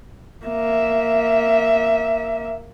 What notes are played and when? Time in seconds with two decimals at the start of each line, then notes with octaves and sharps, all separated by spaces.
0.46 A#3 E5